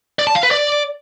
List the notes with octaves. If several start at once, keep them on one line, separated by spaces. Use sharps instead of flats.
D5
A5
F5
B4
D5